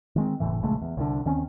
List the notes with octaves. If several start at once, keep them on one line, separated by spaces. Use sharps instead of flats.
D#3 G#3 C4
F#1 E2 A2 E3
A#1 C#3 G#3 A3
E2
C2 D3
D#2 D#3 C4 C#4